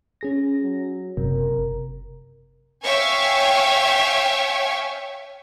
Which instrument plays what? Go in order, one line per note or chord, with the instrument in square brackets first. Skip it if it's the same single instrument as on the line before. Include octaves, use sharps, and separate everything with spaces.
[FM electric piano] C#4 G#4 A#6
[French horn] F#3
[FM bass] F#1 [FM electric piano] C3 [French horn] A#4
[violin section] C#5 E5 F5 G5 G#5 C#6